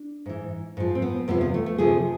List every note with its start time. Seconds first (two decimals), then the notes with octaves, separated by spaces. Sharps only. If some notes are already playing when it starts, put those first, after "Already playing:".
Already playing: D4
0.26 G#2 E3
0.77 G#2 F3
0.95 C4
1.02 B3
1.28 E2 C3 F3 B3
1.41 B3
1.54 A3
1.66 A3
1.78 D2 C3 F3 G#4